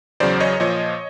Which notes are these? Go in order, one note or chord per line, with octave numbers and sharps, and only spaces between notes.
E2 C#3 F#3 C5 D5
C#5 D#5
A#2 F3 C#5 D#5